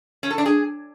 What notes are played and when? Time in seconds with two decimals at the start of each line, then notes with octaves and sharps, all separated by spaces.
0.23 C#4
0.31 A4
0.38 D4
0.46 G#4